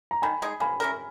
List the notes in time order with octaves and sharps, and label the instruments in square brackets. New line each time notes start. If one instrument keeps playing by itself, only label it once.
[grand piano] A#5
[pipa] D#3 [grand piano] G#5 B5
[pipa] G#3 D#4 G#4
[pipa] A#3 [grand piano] G#5 B5
[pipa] C#4 E4 A#4